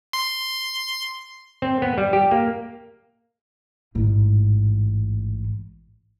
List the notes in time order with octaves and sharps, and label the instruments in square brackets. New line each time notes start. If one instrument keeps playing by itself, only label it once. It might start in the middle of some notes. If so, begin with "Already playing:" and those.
[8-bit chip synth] C6
[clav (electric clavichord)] C4
B3
G3
G4
A#3
[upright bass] A1 G#2